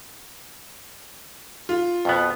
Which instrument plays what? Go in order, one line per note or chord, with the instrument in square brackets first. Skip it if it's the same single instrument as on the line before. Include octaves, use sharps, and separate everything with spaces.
[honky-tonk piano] F4
[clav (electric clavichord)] F2 B2 B3